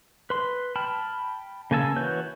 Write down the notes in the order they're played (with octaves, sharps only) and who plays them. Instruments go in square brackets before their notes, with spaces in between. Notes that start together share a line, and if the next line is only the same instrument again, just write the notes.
[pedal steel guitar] B4 C6
G5 A5 B5 F6
C#3 A#3 G#5 A5 E6
E3 F#4 B4 C#5 G6